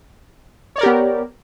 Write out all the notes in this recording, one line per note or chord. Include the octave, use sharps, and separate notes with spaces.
B3 G4 A#4 C#5 D5